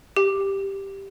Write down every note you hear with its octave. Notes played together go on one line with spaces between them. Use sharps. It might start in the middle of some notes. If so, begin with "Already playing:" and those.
G4